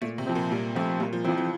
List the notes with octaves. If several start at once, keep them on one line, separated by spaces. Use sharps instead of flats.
A#2 A3
C3
F3 C4
A#2
A#2 G3
F3 A3 C4
A#2 G3
F3
E3 F3 C4
E3